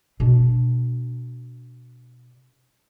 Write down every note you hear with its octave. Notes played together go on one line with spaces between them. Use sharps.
B2 D4